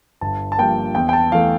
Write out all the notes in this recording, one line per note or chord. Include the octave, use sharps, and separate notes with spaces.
G1 A5
A5
G2 F3 A#3 G5
E2 G5
G5
A5
E3 A3 F5